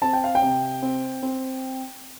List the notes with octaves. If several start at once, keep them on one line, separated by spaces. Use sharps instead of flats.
C4 A5
G5
F5
G5
C3
C4
C4